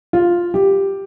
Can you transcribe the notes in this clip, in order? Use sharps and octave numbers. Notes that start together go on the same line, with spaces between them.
F4
G4